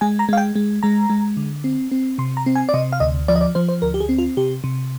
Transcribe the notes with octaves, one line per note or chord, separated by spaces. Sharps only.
G#3 G#5
A#5
G#3 F5
G5
G#3
G#3 A#5
G#3
D3
C4
C4
C3 C6
A#5
C4
G#5
D5
C3 D#5
F5
D2 D#5
F3 D5
D#5
D5
F3 C5
C5
D2 A#4
G4
G#4
C4
F4
C3 G4
C3